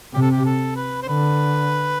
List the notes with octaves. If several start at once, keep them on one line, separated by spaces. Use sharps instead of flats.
C3 G4
A4
G4
A4
B4
C5
D3 B4